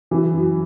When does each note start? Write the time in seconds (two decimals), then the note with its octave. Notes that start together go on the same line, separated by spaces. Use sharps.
0.11 E3
0.33 F#2